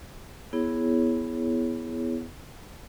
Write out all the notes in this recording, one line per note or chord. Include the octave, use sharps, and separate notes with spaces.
B3 E4 G#4 C#5